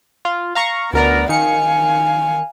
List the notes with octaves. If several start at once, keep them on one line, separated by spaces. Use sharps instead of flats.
F4
F5 A#5 C#6
D2 B3 A#4 D5 A#5
D#3 F5 G#5 C#7